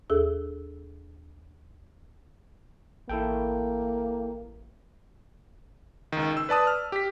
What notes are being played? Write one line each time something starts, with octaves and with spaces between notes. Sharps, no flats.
D#2 G#4 A4 E6
A1 A#3 E4 A4 G5
C#2 D#3
E6
B4 D5 A5 D#6
F6
G4 B6